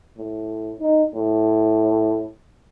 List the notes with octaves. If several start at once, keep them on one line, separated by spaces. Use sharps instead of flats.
A2
D#4
A2